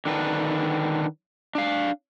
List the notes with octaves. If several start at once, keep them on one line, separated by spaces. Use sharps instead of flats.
D3 D#3 D4 B4
D4 F5